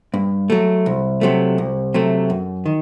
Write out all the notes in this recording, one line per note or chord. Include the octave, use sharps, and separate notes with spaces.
G2
F#3 A3
C2
C3 F#3 A3
C2
C3 F#3 A3
F#2
D#3